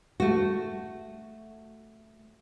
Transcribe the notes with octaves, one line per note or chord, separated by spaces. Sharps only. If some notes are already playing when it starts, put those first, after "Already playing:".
A3 F#4